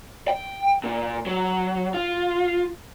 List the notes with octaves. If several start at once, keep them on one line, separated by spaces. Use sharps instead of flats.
G5
A#2
F#3
F4